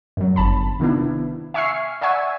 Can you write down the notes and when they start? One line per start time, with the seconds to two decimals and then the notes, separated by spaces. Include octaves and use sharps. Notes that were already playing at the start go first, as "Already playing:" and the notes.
0.17 F#2 F#3
0.36 G1 A5 B5
0.80 C3 D#3 B3 D4 E4
1.54 E5 G#5 C#6 E6 F6 C7
2.01 D5 E5 F#5 G#5 C#6 E6